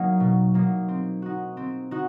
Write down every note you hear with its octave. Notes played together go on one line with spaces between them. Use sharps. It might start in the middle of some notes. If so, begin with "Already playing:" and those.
Already playing: F#3 A#3 D#4
B2
F#3 A#3 D#4
C4
D#4 F#4
C4
D#4 F#4